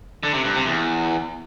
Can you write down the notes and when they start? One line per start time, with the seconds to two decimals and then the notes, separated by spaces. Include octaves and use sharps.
0.23 D3
0.34 C3
0.44 G2
0.55 C3
0.65 E2